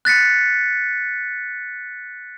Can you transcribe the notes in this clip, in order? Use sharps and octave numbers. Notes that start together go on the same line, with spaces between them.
F#6 A6 B6 C#7